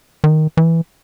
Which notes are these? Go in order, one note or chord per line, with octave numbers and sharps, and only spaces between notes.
D#3
E3